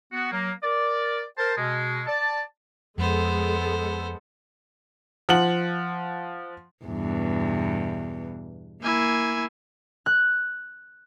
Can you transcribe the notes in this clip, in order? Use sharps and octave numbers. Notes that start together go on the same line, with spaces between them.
B3 F#4
F#3 A#3
A#4 D5
A#4 C5 A5
B2 G#3
D5 A5
F2 G#3 B3 A4 C5
F3 F#5 F#7
E2 G2 B2
A#3 E4 G#5
F#6